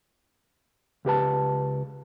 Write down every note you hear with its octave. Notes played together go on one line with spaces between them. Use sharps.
C#2 G4 B4 A5